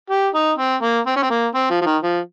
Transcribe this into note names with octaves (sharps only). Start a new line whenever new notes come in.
G4
D#4
C4
A#3
C4
C#4
C4
A#3
C4
F3
F3
D#3
F3